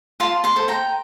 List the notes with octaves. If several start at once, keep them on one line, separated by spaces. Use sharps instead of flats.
F4 A5 C6
A5 C6
A4 C5
G5 A#5